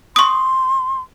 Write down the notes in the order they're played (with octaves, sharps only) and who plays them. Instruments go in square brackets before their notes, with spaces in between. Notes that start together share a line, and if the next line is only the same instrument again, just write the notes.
[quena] C6 [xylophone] C#6 D#6